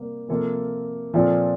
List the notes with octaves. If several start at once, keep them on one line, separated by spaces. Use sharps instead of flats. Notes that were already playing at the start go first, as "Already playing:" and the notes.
Already playing: C3 G3 A#3
C3 F3 A#3 F4 A4
A#2 F3 C4 F4 A4